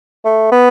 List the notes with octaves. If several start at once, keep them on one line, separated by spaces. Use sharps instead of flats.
A3
B3